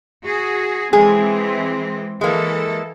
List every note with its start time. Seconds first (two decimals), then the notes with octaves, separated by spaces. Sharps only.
0.24 F#4 G#4
0.93 E3 G#3 C4 G#4
2.21 E3 G#3 A#3 A4